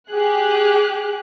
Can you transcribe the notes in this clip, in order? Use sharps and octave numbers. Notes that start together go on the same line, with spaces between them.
G4 G#4 F#6